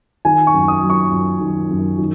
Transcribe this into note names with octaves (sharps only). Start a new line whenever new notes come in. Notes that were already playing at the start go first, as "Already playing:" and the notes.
D#3 G#5
C#6
F#2
D#6
F#3
C#6
F#2
D#3
F#2
D#3